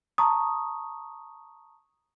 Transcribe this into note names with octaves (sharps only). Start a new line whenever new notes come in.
A5 A#5 C#6 D#6